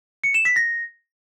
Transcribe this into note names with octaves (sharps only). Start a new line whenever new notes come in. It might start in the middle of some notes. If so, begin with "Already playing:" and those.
C#7
E7
B6
A#6